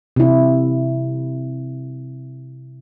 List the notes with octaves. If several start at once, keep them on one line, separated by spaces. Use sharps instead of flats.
C3 E4